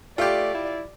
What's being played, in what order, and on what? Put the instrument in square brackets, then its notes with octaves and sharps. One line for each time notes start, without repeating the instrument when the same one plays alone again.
[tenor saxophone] A3 [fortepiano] F4 G4 [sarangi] D5
[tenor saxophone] E4